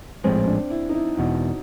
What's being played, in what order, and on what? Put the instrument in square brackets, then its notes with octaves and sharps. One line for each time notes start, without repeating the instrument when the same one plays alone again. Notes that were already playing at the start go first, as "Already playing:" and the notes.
[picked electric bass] A#1 A2 F3 G#3 [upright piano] C4
[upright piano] D4
E4
D#4
E4
[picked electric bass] E1 E2 B2 [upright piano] F#4